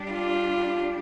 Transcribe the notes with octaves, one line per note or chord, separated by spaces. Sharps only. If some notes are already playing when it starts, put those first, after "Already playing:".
Already playing: G3 D4 G4
F4